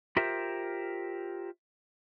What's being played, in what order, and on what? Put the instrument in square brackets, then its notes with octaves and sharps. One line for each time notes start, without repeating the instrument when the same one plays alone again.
[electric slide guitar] F4 G4 A#4 C5 E5